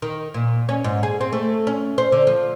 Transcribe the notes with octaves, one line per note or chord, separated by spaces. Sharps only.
D#3
A#2
C#4
G#2
G#4
C4
A3
C#4
C5
D3
F3